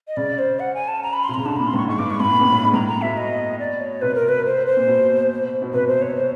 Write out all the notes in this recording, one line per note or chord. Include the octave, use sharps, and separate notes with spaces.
D#5
C#3 D5
C5
F#5
G#5
A5
A#5
B5
C6
C3
C#3 A#5
D3 A5
A#2 B5
A#2 C6
A2 C#6
G#2 C#6
G2 D6
G#2 C#6
A2 B5
A#2
A2
A2
G#2
A2 A#5
A#5
B2 E5
D#5
D5
C#5
C3 B4
A#4
B4
C5
C5
A#2
B2
B2
C3 B4
C5
C#5
C5